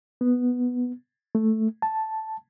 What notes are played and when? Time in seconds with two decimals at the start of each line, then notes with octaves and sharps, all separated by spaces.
0.21 B3
1.35 A3
1.82 A5